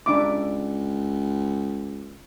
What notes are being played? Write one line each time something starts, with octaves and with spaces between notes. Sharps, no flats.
C#2 D4 E5 D6